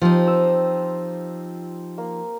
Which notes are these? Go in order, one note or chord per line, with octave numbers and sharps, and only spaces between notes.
F3 C4 D#4 F4 G4
C5 E6
A#3